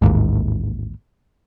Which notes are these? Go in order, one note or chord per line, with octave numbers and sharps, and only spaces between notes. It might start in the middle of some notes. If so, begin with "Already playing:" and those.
A1 D#2 G#2